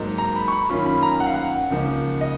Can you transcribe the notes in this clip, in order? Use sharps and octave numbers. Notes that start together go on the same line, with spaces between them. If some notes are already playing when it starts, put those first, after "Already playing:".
Already playing: G#2 F#3 A#3 D#4
A#5
B5
C#6
B5
F#2 D#3 A#3 C#4 F4 B5
B5
A#5
F#5
F5
F#5
C#2 C#3 F3 A#3 D#4
D#5